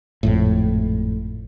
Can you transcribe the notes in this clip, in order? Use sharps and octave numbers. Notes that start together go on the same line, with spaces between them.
G#1 F2 A2